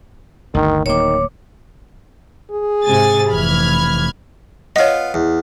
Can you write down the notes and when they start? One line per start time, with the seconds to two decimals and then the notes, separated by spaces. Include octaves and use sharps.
0.55 G1 D2 D#3
0.86 D1 D#3 A#3 C#5 D6
2.51 G#4
2.85 G#2 C3 G#5 A6
3.31 F1 E3 B5 F6 G#6
4.76 B3 F4 C#5 D#5
5.14 E2